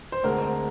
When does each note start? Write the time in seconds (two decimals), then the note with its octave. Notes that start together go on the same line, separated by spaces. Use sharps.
0.12 C5
0.24 D2 D3 G#3 C4 A#4